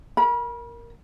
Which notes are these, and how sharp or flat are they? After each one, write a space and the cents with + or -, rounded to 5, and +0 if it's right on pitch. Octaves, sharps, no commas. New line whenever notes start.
A#4 +0 B5 -35